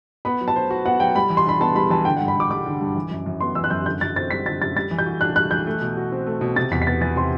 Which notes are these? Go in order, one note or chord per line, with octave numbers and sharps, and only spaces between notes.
B3 B5
F#3
A5
C5
F#4
B3 F#5
F#3 G5
G3 B5
E3
C6
D4 B5
B3 A5
G3 B5
E3 A5
D3 G5
F#5
G2
B5
G2 D6
G3 D6
D3
G2
E3
F#2
F#2
B3 C6
E3 E6
F#6
F#2 G6
D3 G6
F#2 A6
C4 A6
G3 B6
D3 A6
F#2 A6
G3 A6
E3
G6
F#4
D4 F#6
G3 F#6
E3 G6
A3
B2
F#4
C4
A3
B2
C3 A6
E2 B6
B6
B3 A6
E3 A6
C3 C6